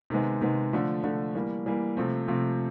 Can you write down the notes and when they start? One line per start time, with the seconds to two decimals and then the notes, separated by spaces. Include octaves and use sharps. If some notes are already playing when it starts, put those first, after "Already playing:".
0.10 C3 D#3 G#3 B3
0.41 C3 D#3 G#3 B3
0.73 D3 F3 A3
1.04 D3 F3 A3
1.35 E3 G3 A#3
1.66 E3 G3 A#3
1.97 C3 F3 A3 C4
2.28 C3 F3 A3 C4